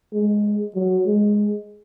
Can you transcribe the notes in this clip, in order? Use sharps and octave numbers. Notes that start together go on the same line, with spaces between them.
G#3
F#3
G#3